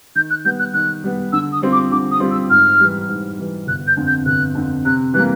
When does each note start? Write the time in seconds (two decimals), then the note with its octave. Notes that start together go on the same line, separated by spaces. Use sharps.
0.15 D#3 G6
0.30 F#6
0.45 G3 B3 G6
0.59 F#6
0.73 D#3 F#6
1.04 G3 B3
1.32 D3 E6
1.52 D#6
1.62 G3 C4 F4
1.72 D6
1.91 D3 D6
2.11 D#6
2.20 G3 C4 F4
2.30 E6
2.50 G#2 F6
2.80 E3 G3
3.08 G#2
3.38 E3 G3
3.67 G1 F#6
3.87 G6
3.97 F2 D3
4.07 G6
4.26 G1 F#6
4.55 F2 D3
4.85 C3 F#6
5.14 E3 G3 A#3 F#6